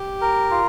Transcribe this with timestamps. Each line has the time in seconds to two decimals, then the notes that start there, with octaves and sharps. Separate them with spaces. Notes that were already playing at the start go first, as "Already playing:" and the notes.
Already playing: G4
0.21 A#4
0.51 F4